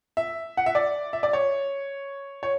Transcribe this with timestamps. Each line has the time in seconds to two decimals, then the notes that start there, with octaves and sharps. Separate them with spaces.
0.17 E5
0.57 F#5
0.66 E5
0.75 D5
1.13 E5
1.23 D5
1.33 C#5
2.43 C#5